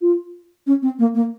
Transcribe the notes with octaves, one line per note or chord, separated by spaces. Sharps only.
F4
C#4
C4
A#3
A#3